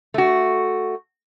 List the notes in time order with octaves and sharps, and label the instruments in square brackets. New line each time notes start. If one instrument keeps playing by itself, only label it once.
[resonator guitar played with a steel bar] A3 F#4